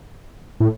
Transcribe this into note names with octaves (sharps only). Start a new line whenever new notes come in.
A2